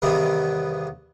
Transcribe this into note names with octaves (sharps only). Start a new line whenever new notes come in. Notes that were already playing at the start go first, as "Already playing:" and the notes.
E2 G2 C3 D#3 B3